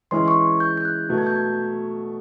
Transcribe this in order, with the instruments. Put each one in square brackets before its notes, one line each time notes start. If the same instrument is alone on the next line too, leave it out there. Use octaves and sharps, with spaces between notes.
[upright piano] E3 G#3 C#4 E4 [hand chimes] C6
[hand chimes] C#6
G6
G6
F#6
[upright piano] B2 F#3 A3
[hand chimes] G#6
G6
G#6